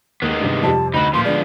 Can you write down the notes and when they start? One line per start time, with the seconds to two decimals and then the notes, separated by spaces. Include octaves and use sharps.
0.22 D#2 D#3 G#3 B3
0.41 G2 C3
0.63 F2 C3 G3 A5
0.94 D2 D#4 F#4 B5
1.13 A#2 F3 B3 B5 C6
1.25 D3 G#3 D5